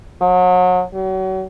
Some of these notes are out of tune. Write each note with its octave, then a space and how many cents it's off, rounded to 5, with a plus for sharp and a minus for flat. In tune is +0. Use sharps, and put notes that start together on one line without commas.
F#3 -30
F#3 +35